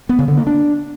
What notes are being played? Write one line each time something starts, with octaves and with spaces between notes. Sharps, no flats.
B3
C#3
D3
A#3
D4